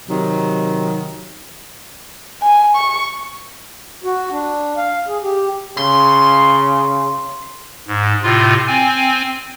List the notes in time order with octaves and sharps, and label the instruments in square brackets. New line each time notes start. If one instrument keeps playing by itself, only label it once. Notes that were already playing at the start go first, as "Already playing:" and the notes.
[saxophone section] C3 D#3 F#3
[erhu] G#5
C#6
[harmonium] F#4
D4
F5
G#4
G4
[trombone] C#3 [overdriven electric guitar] C6
[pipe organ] G#2
A2 C3 F4
C4 G#5